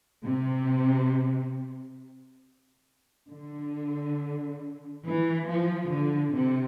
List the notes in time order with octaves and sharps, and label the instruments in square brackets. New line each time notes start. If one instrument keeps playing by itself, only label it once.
[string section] C3
D3
E3
F3
D3
C3